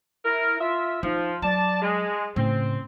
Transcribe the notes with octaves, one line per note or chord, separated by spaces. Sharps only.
E4 A#4
F4 E5
F3 D#4
F#3 D5 A5
G#3
A2 C#3 C4